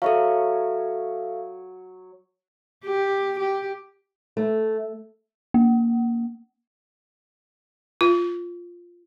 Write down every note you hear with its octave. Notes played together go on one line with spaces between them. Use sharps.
F#3 A4 C#5 E5 F5
G4
G4
A3
A#3
F4